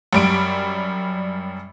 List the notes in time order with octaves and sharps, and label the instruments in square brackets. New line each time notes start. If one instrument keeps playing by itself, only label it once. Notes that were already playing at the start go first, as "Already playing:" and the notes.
[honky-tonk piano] F#2 G3 D7